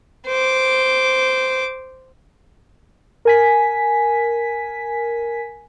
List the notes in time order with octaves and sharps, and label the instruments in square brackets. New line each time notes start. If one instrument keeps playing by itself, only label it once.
[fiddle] C5 D6
[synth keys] A#4 G#5 B6